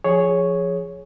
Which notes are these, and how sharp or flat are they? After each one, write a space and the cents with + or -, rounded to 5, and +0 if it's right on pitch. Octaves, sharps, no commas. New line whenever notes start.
F3 +5 G#4 +5 C#5 +0